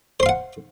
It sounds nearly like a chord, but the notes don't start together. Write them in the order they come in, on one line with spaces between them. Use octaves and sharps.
C5 C6 F5 F#5